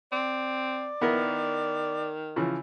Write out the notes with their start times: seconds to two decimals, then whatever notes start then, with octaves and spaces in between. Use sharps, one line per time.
0.12 C4 D5
1.01 D#3 B3 E4 A#4
2.36 C#3 E3 F3